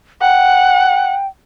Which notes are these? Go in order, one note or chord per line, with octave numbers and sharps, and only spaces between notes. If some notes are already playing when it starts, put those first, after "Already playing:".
F#5 G5